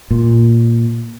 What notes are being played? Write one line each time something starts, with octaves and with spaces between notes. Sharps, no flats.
A#2